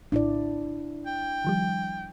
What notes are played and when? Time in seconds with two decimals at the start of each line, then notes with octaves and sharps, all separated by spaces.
0.12 A#1 A2 D4 E4 D5
1.07 G5
1.44 D#3 F3 G3